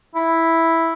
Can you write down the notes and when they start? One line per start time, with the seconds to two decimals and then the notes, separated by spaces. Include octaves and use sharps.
0.15 E4